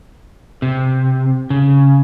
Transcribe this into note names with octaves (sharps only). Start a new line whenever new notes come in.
C3
C#3